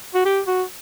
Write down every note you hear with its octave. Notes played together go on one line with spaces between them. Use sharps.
F#4
G4
F#4